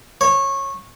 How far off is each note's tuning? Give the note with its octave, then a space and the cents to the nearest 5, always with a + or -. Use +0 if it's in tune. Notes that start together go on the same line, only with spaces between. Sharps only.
C#5 -20